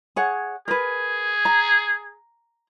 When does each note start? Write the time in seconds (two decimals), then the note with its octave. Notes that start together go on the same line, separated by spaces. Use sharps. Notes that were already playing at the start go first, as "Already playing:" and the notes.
0.16 G#4 C#5 F#5
0.68 G#4 A#4 B4
1.45 A#5